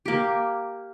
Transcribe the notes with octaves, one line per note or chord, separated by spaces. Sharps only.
A#3 G4